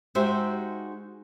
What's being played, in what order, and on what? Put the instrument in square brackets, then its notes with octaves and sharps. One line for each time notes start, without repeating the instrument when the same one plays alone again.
[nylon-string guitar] G#3 D#4 F#4 G4 C5 E5